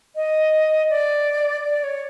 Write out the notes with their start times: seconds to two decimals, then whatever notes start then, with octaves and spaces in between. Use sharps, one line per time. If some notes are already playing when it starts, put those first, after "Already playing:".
0.16 D#5
0.90 D5
1.66 D5
1.84 C#5